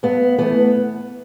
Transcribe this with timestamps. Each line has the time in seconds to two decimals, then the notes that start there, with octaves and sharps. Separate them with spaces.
0.03 G2 B3
0.38 E3 A3 B3